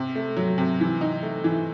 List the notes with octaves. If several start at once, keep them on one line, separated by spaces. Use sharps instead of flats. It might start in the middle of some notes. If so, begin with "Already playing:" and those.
Already playing: C3
A3
F#3
C3
E3
D#4
A3
E3